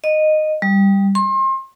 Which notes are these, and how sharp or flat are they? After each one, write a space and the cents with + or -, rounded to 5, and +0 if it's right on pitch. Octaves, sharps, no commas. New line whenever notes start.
D#5 -10
G3 +10
C6 +35